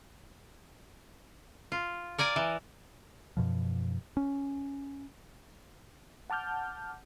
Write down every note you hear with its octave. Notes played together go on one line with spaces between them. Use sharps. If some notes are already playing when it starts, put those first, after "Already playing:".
F4
A#4 D5 G#5 A#5
E3
F#2 B2 F3
C#4
F#5 A5 D6 F6 G6